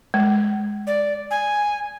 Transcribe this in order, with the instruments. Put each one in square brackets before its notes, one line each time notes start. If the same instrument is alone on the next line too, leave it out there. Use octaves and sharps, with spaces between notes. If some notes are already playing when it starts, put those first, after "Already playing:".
[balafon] G#3
[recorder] D5
G#5